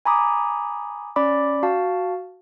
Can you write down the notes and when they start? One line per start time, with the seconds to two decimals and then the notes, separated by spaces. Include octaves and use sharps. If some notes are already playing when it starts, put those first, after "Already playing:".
0.05 G#5 A#5 B5 D6 D#6
1.16 C#4 D5 B5 D6
1.63 F#4 F5 A5